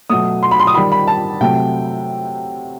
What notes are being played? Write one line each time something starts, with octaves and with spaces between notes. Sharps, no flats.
B2 F#3 A3 D#6
C6
B5
C6
D#6
D#3 G3 B5
B5
A5
C3 F#3 A3 G5